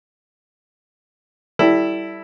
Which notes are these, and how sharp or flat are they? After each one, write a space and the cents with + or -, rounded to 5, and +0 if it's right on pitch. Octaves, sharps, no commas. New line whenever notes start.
G3 -15 E4 +0 A4 +0